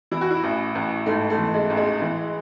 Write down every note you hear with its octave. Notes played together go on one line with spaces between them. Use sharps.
E3 E4
F#4
E4
A1
A1
G#2 A3
A3
E3
G#3
A1
G#3
E3